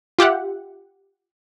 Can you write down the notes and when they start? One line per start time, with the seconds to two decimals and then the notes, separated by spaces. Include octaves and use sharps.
0.19 F4 G4 E5 F#5